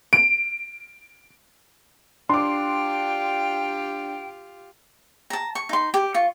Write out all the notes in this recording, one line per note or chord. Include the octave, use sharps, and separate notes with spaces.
D7
D4 F4 G4 G5 C6 D6
A5 A#5
C#6
D#4 C6
G4
F4 C#6